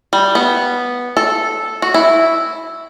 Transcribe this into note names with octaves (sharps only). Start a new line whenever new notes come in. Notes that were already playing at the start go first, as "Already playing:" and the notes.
G3
B3
A4
F#4
E4